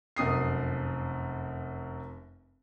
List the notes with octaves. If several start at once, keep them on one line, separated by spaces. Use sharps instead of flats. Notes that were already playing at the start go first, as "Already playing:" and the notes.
F1 F#2 D#6 C7